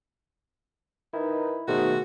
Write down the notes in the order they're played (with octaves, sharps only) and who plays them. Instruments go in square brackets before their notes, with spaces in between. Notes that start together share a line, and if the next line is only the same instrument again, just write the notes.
[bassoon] D#3 [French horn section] D#4 B4 [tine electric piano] E4
[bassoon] G#2 [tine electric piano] B2 D#3 A3 [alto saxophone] F#4 [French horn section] G#4